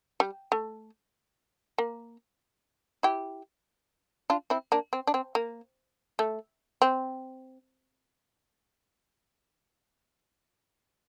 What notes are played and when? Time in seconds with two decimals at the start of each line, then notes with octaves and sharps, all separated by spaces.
0.20 G3
0.52 A3
1.78 A#3
3.03 E4 G4
4.30 D4 F4
4.50 C4 E4
4.72 A#3 D4
4.93 C4
5.07 D4
5.14 C4
5.35 A#3
6.19 A3
6.82 C4